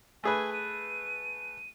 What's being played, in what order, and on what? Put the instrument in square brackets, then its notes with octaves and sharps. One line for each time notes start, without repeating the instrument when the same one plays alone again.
[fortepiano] A3 G#4 B4 [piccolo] G#5
[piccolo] D#7